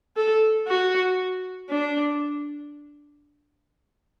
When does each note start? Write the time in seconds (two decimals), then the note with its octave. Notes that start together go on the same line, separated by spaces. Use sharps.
0.17 A4
0.67 F#4
1.69 D4